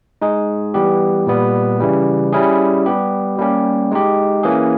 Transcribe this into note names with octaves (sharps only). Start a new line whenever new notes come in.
G#3 D#4 G#4
E3 G3 B3 G4
A#2 G3 B3
C#3 E3 G3
G3 C#4 E4 G#4
G3 B3 G4
G3 A#3 C#4 G4
G#3 D#4 G4
E3 A#3 C#4 G#4